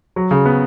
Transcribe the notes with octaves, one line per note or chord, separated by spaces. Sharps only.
F#3
C#3
B3